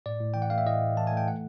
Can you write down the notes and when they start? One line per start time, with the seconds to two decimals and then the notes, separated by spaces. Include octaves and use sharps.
0.06 A2 D5
0.21 A2
0.34 E3 G5
0.42 F#5
0.50 A3 F5
0.58 E5
0.66 A2 D#5
0.81 A2
0.97 E3 A5
1.07 G#5
1.12 A3
1.17 G5
1.28 F#5